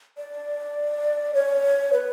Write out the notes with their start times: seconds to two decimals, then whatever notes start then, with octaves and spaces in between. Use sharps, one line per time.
0.18 D5
1.34 C#5
1.93 B4